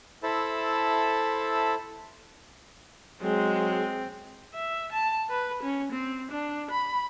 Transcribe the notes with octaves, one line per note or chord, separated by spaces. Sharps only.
E4 A4 C5 E5 A5 B5
F#3 G#3 C4
E5
A5
B4
C#4
C4
D4
B5